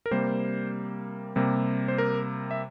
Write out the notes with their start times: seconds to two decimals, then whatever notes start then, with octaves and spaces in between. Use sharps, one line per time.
0.06 A#4
0.11 C3 G3 A#3 C5
1.36 C3 G3 A#3
1.88 C5
1.98 A#4
2.51 E5